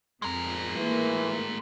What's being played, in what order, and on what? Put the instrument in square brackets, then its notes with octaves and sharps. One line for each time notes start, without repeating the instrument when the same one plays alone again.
[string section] F2 [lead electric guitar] G#3 A#4
[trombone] E3 [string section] A3 A#3